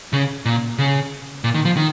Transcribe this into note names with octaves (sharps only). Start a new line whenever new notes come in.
C#3
A#2
C#3
A#2
D#3
F3
D#3